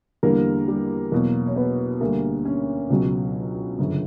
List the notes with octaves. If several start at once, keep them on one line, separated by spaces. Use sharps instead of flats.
E2 D3 G3 A#3 A#4
G3 G4
E2 B2 F#3 A#3 A#4
C#5
B3 B4
D2 D3 G3 A#3 A#4
C#4 C#5
C#2 B2 F#3
G1 F#2 C#3